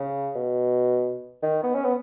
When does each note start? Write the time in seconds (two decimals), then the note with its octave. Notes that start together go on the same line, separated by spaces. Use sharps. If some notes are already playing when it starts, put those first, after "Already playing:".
Already playing: C#3
0.35 B2
1.43 D#3
1.63 B3
1.74 C#4
1.85 B3